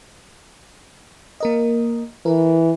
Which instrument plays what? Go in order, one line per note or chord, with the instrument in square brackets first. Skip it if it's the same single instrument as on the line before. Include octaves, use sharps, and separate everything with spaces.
[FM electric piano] A#3 A#4 D#5
[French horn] E3 [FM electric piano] A#4